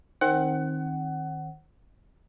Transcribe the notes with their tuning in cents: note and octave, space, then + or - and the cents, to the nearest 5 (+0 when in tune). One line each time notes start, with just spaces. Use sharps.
D#3 +0 C4 +25 F#5 +20